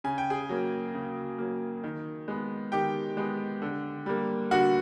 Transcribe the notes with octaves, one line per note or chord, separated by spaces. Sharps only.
C#3 G#5
G5
G#4 G#5
F#3 A#3
C#3
F#3 A#3
D#3
G#3 B3
D#3 G4 G5
G#3 B3
D3
G3 A#3
D3 F#4 F#5